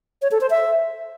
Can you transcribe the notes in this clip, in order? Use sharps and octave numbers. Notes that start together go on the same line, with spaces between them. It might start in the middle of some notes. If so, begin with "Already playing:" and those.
C#5
A4
C5
E5